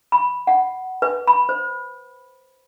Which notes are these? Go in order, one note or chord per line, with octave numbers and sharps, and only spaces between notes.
B5
F#5
B4
B5
C5